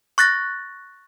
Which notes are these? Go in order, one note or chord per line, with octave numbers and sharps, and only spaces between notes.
C#6 F#6 A6 A#6